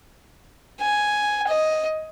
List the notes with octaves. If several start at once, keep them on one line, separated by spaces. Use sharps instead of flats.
G#5
D#5